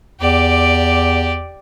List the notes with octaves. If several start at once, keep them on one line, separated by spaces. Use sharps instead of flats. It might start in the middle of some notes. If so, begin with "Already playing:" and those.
E2 G4 D5